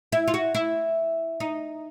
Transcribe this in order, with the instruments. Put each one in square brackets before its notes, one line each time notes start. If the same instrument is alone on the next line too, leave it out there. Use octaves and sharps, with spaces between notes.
[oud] E4
F4
F#4
E4
D#4